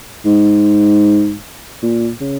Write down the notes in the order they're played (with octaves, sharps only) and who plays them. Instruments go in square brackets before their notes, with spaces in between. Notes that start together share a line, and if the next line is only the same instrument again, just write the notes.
[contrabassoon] G#2
A#2
C#3